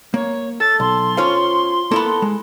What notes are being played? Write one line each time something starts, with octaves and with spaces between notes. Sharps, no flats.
A#3 C#5
A4 A6
B1 C6
C#4 F4 C5 C#5 F5
A#3 B3 E4 A4
G#3